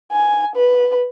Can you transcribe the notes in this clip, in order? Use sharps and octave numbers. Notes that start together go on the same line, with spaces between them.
G#5
B4